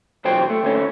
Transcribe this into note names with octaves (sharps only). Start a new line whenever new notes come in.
B1 E2 F#3 C5 G5
A3
D2 A3 C#4